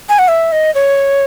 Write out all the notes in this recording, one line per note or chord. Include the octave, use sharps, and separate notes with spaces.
G#5
F#5
E5
D#5
C#5